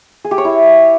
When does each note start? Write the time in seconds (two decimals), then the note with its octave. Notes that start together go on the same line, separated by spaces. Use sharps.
0.24 G#4
0.31 G4
0.38 C#5
0.45 E4